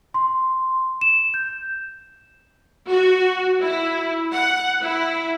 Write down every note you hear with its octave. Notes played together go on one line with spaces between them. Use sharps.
C6
E7
G6
F#4
E4
F#5
E4